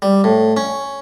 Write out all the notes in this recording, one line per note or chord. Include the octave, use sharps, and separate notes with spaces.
G3
A2
C#4